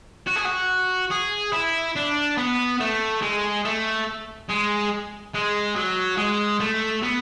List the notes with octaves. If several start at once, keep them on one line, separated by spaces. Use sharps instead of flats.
F#4
G#4
F#4
G#4
E4
D4
B3
A3
G#3
A3
G#3
G#3
F#3
G#3
A3
B3